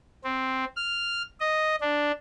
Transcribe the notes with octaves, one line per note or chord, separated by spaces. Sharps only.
C4
F6
D#5
D4